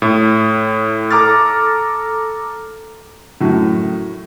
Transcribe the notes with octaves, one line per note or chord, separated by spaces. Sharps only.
A2
A4 A#5 D6 F6 A6
F#2 A2